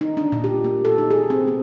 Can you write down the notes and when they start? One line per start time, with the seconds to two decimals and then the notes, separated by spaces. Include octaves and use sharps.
0.01 D#4
0.17 D4
0.32 A#2
0.44 G4
0.64 A#3
0.85 A4
0.98 D#4
1.11 G#4
1.30 C4
1.48 B3